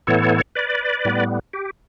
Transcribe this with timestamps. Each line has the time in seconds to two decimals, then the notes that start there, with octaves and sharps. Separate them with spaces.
0.07 A2 E3 B3 A4 C#5
0.55 B4 D5
1.05 A2 G3 B3
1.53 G4